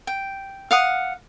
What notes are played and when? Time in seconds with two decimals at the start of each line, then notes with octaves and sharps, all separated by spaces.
0.07 G5
0.71 F5 F#5 D#6